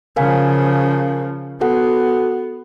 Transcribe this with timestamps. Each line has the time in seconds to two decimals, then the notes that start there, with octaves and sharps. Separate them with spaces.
0.16 C#3 F3 A#4 F5 G#5
1.61 B3 F#4 A4 F#5